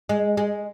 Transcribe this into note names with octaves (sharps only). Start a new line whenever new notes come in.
G#3
G#3